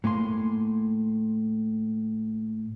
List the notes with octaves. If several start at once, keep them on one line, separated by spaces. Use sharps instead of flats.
A2 A#3 G#5 C6